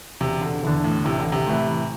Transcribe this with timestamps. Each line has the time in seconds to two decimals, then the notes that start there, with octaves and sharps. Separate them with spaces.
0.21 E1 C3
0.42 D3
0.63 E2 D3
0.84 A2
1.05 A1 C3
1.19 D3
1.32 C3
1.48 A2 E3